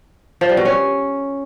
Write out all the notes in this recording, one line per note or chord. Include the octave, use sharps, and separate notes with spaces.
F3
G3
B2
C#4